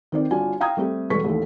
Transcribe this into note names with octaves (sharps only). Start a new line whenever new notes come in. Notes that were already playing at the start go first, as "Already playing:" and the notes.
D#3 C4 D5
G1 D4 F4 F#4 G#5
F5 G5 A#5 D#6 G#6
G3 A3 C4 G4
E1 G3 A4 B4 C#6 B6
A1 D#2 A4